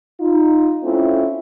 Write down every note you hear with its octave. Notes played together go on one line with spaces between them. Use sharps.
D#4 F4
A3 C4 C#4 E4 F4